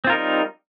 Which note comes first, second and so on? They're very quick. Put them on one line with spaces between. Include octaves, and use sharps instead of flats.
C4 F4 A#4 D#4 G3